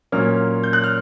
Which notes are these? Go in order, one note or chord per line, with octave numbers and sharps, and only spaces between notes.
A#2 F#3 A#3 C#4 F6
G6
F#6
F6